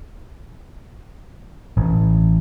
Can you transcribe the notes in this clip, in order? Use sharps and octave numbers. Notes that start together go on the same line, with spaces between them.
A1